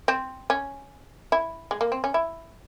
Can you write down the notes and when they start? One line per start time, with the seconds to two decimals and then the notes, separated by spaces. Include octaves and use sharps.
0.08 C4
0.50 C#4
1.32 E4
1.71 G#3
1.81 A#3
1.92 C4
2.04 C#4
2.14 E4